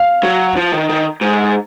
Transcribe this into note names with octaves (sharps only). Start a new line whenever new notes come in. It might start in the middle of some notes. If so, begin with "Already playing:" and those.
Already playing: F5
F#3
F3
D#3
D#3
G#2